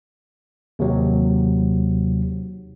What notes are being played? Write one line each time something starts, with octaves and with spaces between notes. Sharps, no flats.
D#2 C3 F#3